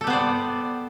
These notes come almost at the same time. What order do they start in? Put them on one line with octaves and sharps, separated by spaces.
A4 G4 B3 C5 D5